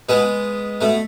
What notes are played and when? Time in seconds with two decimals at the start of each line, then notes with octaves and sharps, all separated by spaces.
0.09 B2 G#3 B3
0.81 B2 A3